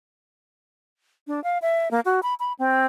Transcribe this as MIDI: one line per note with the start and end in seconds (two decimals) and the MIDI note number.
1.27 1.42 62
1.44 1.58 77
1.62 1.91 76
1.91 2.00 58
2.05 2.20 66
2.23 2.34 83
2.40 2.53 83
2.59 2.87 60